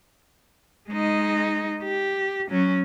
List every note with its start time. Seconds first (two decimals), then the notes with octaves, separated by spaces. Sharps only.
0.89 G#3 D#4
1.84 G4
2.50 F#3 C#4